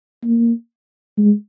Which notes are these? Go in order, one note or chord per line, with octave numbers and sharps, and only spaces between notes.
A#3
G#3